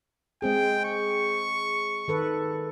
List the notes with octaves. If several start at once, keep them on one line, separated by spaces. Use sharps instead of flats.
G#3 C4 G#4 G5
C#6
D#3 A4 B4